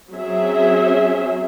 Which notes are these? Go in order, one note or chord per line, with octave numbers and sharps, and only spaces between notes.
F#3 C4 C#4 G#4 E5